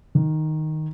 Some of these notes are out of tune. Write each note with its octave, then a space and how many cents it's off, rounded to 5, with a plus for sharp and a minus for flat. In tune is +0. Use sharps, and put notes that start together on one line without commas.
D#3 +0